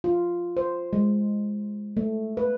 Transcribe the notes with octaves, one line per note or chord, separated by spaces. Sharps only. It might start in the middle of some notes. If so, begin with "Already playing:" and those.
F4
C5
G#3
A3
B4